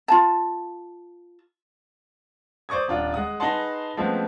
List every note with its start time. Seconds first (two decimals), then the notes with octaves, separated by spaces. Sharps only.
0.08 F4 A5
2.69 C5 D5 C#6 D#6 G#6
2.88 D#1 D4 F4 F#5
3.14 G#3 F#5 D#6
3.40 D#4 G#4 B4 F#5 A5 C6
3.97 C#3 F3 G#3 A3 B3 C4